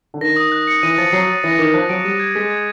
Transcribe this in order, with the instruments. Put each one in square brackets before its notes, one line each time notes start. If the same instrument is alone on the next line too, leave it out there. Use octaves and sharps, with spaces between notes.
[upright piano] D3
[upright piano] D#3 [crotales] A#6
[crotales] D#6
F#6
C#7
[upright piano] E3 [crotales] D#7
[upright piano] F3 [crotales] A6
[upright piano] F#3 [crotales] C7
[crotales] A6
[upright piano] E3 [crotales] A#6
[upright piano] D#3 [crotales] D6
[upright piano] F3 [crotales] F#6
[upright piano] F#3 [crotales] D7
[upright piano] G3 [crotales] D#7
[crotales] G#6
[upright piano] G#3 [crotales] B6
[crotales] G#6